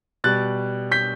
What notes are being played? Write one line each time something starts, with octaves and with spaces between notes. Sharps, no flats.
B2 G3 F#6 A6
G6 B6